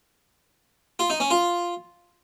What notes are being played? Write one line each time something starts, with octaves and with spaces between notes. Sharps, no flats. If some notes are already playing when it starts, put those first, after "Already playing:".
F4
D#4
C#4
F4